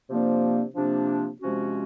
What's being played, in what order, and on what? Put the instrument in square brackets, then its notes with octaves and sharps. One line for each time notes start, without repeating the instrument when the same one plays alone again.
[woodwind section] C3 F3 A#3 D4
C3 F3 A#3 D4
C3 F3 G#3 C#4 F#4